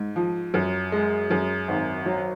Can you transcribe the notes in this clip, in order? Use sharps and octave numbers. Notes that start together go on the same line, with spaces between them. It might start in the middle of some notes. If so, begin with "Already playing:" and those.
Already playing: G#2
F3
F#2
G#3
F#2
G#1
F#3